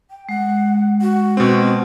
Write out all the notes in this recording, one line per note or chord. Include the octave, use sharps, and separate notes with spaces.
G5
G#3 F#5
F#4
B2 C4